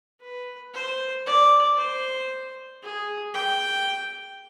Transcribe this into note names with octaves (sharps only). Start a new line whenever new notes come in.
B4
C5
D5
C5
G#4
G5